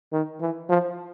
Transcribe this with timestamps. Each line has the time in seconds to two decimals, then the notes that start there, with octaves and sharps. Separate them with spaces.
0.13 D#3
0.41 E3
0.69 F3